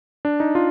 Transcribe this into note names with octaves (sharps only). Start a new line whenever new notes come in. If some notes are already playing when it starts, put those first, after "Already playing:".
D4
D#4
F4